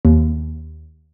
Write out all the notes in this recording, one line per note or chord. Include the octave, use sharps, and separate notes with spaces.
D#2